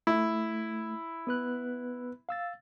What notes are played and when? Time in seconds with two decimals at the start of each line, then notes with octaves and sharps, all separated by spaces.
0.07 A3 E4
1.27 B3 B4 F#6
2.29 F5 E6 A6